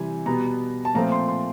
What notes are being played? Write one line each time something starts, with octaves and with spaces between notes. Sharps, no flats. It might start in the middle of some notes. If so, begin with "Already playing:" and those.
Already playing: C3 E3 G3 G#5
B2 G3 B3 A#5
A5
A#2 F3 A3 C4 A#5
C6
C6